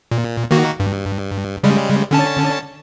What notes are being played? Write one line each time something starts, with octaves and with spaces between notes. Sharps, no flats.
A#2
D#3 A#3 F#4
G2
C#3 G3 G#3
D3 C#4 A5